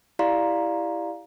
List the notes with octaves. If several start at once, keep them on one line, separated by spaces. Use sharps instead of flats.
E4 G4 D5 F5 A#5 C6